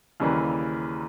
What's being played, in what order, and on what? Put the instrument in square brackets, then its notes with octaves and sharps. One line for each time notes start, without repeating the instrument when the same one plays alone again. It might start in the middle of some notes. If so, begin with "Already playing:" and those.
[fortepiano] D#2 C#3 E3 G3 A#3